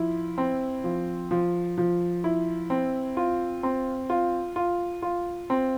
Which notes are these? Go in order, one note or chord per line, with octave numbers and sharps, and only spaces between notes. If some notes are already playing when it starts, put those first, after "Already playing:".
Already playing: F3 E4
C4
F3
F3
F3
E4
C4
F4
C4
F4
F4
F4
C4